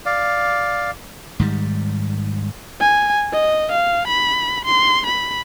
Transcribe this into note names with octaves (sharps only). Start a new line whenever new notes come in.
D5 F5
G#2 D#3 G3
G#5
D#5
F5
B5
C6
B5